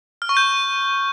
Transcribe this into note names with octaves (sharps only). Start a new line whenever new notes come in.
F6
C#6
G6